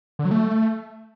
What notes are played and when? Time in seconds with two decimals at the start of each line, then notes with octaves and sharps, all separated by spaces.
0.19 D3
0.25 F#3
0.31 A3